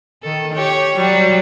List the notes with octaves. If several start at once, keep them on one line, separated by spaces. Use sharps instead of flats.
D#3 A4
G4 C#5
F#3 G3